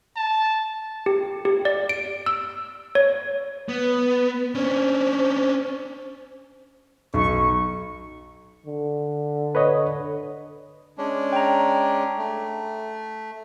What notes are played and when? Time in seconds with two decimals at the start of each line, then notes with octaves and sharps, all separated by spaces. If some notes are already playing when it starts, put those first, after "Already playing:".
0.16 A5
1.06 G4
1.45 G4
1.65 D5
1.89 D7
2.26 E6
2.95 C#5
3.69 B3 B4
4.55 C#4 D4 C5
7.14 B1 C#6
8.66 D3
9.55 B4 C#5 D#5
10.98 G#3 C#4 D4
11.33 G5 A#5
12.18 A3